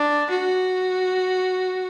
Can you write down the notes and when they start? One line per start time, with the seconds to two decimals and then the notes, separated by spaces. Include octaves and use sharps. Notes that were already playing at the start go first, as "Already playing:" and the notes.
Already playing: D4
0.30 F#4